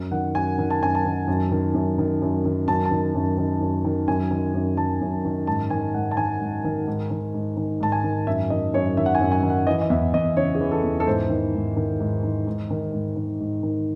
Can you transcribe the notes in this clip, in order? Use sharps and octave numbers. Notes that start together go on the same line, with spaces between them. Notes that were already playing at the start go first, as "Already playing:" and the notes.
Already playing: F#2
D#3 F#5
F#2 G#5
D#3
A5
F#2 G#5
A5
D#3
F#2
D#3
F#2
D#3
F#2
D#3
F#2 A5
A5
D#3
F#2
D#3
F#2
D#3
F#2 G#5
D#3
F#2
D#3 A5
F#2
D#3
G#2 A5
D#3 G#5
G#2 F#5
A5
D#3 G#5
G#2
D#3
G#2
D#3
G#2
D#3
G#2 A5
G#5
D#3
F#2 E5
D#3 D#5
F#2 C#5
D#3 E5
F#5
G#5
F#2
G#5
D#3
F#5
E3 D#5
D#5
E2 E5
E2 D#5
C#3 C#5
G#4
E3
A4
E2
A4
G#2 C5
D#3
G#2
D#3
G#2
D#3
G#2
D#3
G#2
D#3
G#2
D#3